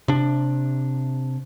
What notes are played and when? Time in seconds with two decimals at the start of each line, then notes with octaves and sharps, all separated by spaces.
0.08 C3 D4